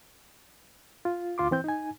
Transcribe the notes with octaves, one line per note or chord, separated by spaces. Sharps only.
F4
D2 F4 C6 D6
E3 C4 G6
D#4 G#5